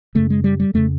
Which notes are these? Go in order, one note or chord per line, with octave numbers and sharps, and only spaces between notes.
F#2 C#3 A3
G#3
G3
G3
F2 C#3 A3